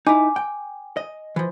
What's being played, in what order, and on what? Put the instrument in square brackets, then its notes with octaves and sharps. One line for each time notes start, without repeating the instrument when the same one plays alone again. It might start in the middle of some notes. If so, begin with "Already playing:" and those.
[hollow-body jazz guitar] D#4 E4 [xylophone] G#5 D6
[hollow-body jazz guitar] G5
D#5
E3 F3